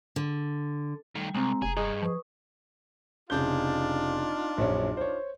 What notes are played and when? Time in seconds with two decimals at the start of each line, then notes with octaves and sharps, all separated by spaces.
0.16 D3
1.15 D#3 G3 A3
1.34 C2 G#3 C4 A#5
1.62 F1 G#4
1.77 G2 G#4 D#5
2.02 F3 B4 C#6 D#6
3.30 F1 C#3 D4 D#4 F4 G6
4.58 A#1 F#2 C#4
4.97 C5 C#5